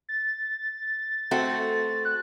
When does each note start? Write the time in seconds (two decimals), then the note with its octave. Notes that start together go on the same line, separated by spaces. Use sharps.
0.09 A6
1.31 A3 C4 F#4
2.05 F#6